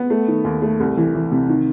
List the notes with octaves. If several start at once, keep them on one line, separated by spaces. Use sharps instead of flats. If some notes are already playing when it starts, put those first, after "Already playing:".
Already playing: B3
A3
D#3
D#2
A3
C2
E3
E3
C3
D#3